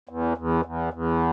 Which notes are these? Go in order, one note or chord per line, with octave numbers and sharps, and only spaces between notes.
E2
E2
E2
E2